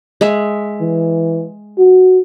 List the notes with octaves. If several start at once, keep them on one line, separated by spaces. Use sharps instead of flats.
G#3 E5
E3
F#4